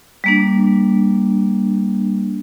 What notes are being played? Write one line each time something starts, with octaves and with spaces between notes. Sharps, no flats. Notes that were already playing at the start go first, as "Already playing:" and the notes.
G3 A#3 D4